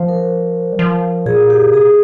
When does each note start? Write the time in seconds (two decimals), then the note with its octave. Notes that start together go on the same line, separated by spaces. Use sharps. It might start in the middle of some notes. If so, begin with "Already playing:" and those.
Already playing: F3 C5
0.09 A#4
0.73 G3
0.79 F3
1.26 A#2 G#4
1.50 G4
1.74 C3 G#4